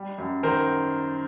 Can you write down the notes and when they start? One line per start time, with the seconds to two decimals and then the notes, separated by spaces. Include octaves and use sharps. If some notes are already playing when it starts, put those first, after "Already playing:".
Already playing: G3
0.18 F#2
0.43 D#3 A#4 C5